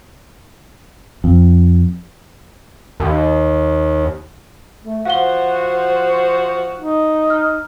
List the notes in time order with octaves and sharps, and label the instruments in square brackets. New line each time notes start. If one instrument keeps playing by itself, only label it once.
[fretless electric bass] F2
[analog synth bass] D#2
[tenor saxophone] A3
[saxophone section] F3 F#4 [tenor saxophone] C5 [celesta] F5 F#5 G7
[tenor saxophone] D#4
[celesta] F6